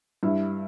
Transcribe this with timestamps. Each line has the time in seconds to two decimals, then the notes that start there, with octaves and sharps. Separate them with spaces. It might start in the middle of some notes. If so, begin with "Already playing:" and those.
0.23 G2 E4